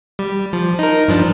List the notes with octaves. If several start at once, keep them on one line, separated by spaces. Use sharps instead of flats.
G3
F3
D#4 A#4
G2 F3 D4